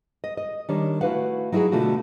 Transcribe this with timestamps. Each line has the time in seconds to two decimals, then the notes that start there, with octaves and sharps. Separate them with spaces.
0.24 D#5
0.37 D#5
0.69 D#3 G3 D4 C#5
1.01 A3 E4 F#4 B4 F5 F#5
1.52 F#3 D#4 E4 F#4 G#4
1.72 B2 D3 A3 F4 F#4